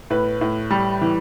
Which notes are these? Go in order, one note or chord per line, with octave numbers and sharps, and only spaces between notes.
A2 B4
A2
G3
E3